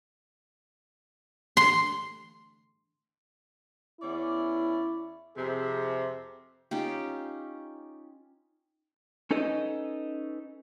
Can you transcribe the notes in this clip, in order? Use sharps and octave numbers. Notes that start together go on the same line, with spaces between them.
C6
E2 C#4 E4 D5
F2 C3 G#4
C#4 D#4 F4 G4
C#4 D#4 A4 B4 D#5